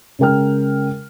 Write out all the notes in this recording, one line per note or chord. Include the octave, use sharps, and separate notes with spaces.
C#3 G#3 A#4 G5 F6